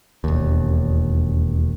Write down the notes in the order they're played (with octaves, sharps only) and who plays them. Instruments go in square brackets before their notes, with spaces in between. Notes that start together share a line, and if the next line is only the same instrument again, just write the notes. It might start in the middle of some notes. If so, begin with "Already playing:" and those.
[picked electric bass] E1 D#2